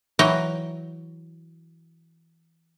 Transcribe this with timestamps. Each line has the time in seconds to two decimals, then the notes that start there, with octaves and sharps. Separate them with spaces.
0.19 E3 F#3 G5 A#5